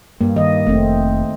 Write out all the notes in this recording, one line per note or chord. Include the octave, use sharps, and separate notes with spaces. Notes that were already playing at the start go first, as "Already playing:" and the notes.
G2 A#3
D#3 D#5
F1 A3 C4